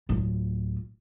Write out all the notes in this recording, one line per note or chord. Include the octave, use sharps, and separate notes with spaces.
D1 F4